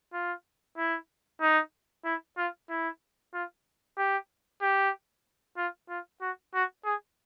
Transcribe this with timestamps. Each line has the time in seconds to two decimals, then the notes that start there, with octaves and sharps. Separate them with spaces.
0.13 F4
0.78 E4
1.41 D#4
2.05 E4
2.38 F4
2.69 E4
3.34 F4
3.98 G4
4.62 G4
5.57 F4
5.89 F4
6.21 F#4
6.54 F#4
6.85 G#4